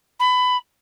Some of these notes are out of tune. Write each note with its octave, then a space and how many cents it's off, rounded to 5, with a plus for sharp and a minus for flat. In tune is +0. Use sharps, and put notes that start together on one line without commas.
B5 +20